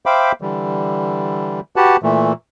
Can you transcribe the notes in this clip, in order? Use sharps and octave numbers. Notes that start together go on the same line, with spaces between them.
C5 E5 F5 G5 B5 D6
D3 E3 G3
F#4 G4 B4 F#5 A5
A#2 E3 A3